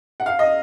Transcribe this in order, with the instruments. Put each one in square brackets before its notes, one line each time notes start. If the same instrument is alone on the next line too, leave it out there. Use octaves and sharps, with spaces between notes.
[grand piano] F#5
F5
D#5